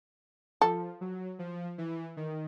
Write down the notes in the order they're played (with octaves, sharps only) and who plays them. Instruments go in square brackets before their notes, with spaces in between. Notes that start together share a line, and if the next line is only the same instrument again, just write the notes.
[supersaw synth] F3 [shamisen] A4
[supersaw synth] F#3
F3
E3
D#3